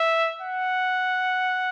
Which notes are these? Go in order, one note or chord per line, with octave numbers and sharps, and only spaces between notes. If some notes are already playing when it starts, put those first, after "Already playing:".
Already playing: E5
F#5